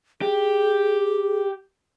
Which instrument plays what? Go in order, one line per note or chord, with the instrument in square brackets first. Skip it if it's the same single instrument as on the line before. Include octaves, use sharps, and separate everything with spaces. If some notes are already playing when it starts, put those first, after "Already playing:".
[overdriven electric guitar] G4 [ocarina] G#4